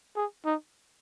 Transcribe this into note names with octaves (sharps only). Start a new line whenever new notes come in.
G#4
D#4